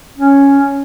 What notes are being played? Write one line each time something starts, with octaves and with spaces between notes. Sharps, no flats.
C#4